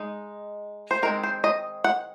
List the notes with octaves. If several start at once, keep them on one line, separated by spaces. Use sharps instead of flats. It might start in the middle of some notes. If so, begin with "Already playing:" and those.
Already playing: G#3 D#4
C5
D#3 G#3 C4 A#4
C5
D#5
F#5